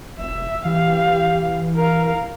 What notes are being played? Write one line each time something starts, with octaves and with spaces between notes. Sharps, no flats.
F1 E5
E3 G4 F5
A#4 F5